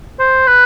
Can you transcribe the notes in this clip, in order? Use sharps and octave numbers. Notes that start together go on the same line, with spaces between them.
C5
B4